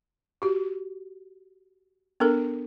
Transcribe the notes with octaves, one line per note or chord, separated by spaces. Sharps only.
F#4 G4
B3 D4 A4 A#4